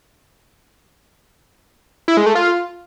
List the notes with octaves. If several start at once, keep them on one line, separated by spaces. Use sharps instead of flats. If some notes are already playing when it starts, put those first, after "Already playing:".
E4
G#3
A3
F4